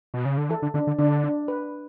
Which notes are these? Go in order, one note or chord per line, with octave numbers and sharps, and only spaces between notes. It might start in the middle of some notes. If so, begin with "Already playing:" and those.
B2
C#3
D3
E3 A4
D3
D3 D4
D3
D3 D4
D4
B4